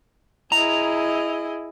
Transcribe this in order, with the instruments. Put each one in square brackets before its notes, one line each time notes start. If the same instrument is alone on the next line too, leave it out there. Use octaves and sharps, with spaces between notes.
[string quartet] E4 G#4 D#5 [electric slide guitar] A#5